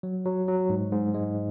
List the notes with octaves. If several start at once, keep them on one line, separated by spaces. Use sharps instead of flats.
F#3
F#3
F#3
G#2
G#2
G#3